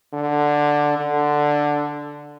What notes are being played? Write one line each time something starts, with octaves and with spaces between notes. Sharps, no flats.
D3
D3